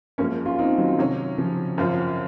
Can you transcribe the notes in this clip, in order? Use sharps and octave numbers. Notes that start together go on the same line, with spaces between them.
F#2 F3 G#3 A#3 C#4
C#4 F4
C4 D#4
D#3 F#3
C3 F#3 C#4
C#3 F3
F#2 F3 C4 F4